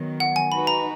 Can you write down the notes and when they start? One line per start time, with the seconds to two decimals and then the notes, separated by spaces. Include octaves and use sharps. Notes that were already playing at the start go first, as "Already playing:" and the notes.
Already playing: D#3 F#3 B3
0.20 F#5
0.36 G#5
0.52 G#3 D#4 F#4 B4 B5
0.67 A#5